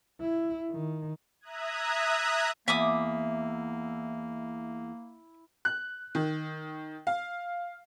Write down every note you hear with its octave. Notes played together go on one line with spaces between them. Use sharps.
E4
D#3
E5 A#5 D#6 F#6 G#6
E2 A#3 E4 E5 D6 D#6
F#6
D#3
F5